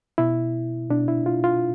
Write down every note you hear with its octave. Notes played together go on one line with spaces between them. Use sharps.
B2 E4
B2 D4
E4
F4
F4